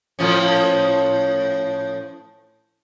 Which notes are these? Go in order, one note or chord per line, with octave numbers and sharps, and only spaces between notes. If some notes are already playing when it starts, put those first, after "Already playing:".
A2 F3 C#4